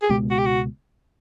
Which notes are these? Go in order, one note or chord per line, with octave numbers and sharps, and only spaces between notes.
G#4
C#2 B2 G#3 B3 G4
F#4
G4
F#4